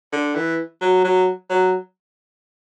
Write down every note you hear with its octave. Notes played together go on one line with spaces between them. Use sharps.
D3
E3
F#3
F#3
F#3